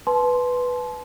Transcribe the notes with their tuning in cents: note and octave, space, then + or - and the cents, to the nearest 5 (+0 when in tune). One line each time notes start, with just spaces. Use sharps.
B4 +0 A5 -35 C6 +0